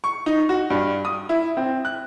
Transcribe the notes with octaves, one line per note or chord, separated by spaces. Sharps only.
C#6
D#4
F#4
G2
D#6
E4
C4
F#6